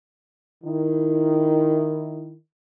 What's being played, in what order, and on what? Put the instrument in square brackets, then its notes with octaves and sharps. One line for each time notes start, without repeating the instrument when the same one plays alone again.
[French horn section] D#3 E4